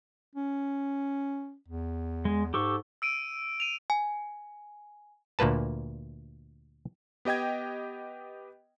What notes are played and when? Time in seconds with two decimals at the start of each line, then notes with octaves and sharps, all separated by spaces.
0.35 C#4
1.68 E2
2.25 G#3
2.54 G#2 G4 A4 C#6
3.02 E6 D7 D#7
3.60 D#7 F7
3.90 G#5
5.39 D2 A#2 A#3 B4 A5
7.25 B3 G4 D#5 G5 G#6